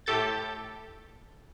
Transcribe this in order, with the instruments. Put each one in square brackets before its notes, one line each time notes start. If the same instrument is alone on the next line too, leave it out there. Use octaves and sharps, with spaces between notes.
[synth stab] A2 G4 A4 G6 A6